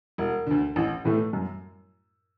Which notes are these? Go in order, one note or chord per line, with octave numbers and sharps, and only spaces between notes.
E1
D2 D3
A1
A2 E3 A3
F#2